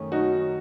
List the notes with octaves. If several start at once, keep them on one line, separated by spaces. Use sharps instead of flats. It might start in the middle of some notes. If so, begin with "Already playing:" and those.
Already playing: F#2 D#3 A3 C#4
D#4 F#4